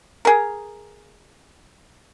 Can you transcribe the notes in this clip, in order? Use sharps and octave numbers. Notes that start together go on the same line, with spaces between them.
G#4 A#4